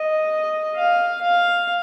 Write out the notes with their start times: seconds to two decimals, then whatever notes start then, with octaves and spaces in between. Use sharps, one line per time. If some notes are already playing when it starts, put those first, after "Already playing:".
Already playing: D#5
0.76 F5
1.22 F5